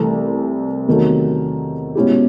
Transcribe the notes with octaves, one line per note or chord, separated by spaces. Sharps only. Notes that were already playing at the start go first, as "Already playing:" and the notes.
Already playing: C2 C3 E3 A3
E2 C3 D#3 F#3 A3
B2 G#3 C#4 E4 G4